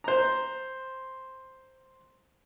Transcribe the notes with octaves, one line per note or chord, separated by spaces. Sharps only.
C5 A#5